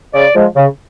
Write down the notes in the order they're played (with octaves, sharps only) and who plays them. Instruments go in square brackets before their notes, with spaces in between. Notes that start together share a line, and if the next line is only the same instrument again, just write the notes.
[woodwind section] C#3 D5
F3 G#3
C#3